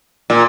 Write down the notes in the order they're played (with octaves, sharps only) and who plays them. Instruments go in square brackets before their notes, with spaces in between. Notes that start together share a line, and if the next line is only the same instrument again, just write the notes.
[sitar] A#2